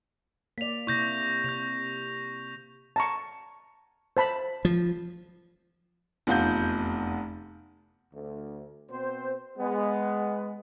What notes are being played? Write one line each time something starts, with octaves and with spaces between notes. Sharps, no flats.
A#3 D5 B6 F7
C3 A#3 E4 C#6 G6 A#6
C3 G6 F7
A5 A#5 C#6
C5 A5 B5
F3
F1 E2 F4 F#5 G6
D2
B2 C4 C5
G#3 B3